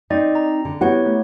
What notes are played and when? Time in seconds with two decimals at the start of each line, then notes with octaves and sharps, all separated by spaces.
0.10 C4 D#4 D5 D#5
0.35 A#5
0.65 D3
0.81 B3 E4 G4 C#5 F#5
1.06 A3